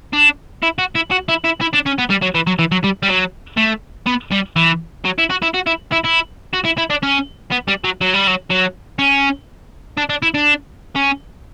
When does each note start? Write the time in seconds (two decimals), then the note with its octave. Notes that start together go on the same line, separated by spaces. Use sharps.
0.13 D4
0.63 E4
0.78 F#4
0.95 E4
1.11 F#4
1.29 E4
1.44 E4
1.61 E4
1.73 D4
1.86 C#4
1.98 B3
2.10 G3
2.22 F#3
2.35 E3
2.47 F#3
2.59 E3
2.72 F#3
2.84 G3
3.03 G3
3.08 F#3
3.57 A3
4.07 B3
4.32 G3
4.56 E3
5.05 F#3
5.18 E4
5.30 F#4
5.42 E4
5.54 F#4
5.66 E4
5.92 E4
6.04 E4
6.53 F#4
6.65 E4
6.78 E4
6.90 D4
7.03 C#4
7.51 B3
7.68 G3
7.84 F#3
8.01 F#3
8.14 G3
8.27 F#3
8.50 F#3
8.99 C#4
9.98 D4
10.10 D4
10.22 E4
10.34 D4
10.96 C#4